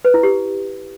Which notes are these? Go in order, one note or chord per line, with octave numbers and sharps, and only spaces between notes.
B4
E4
G4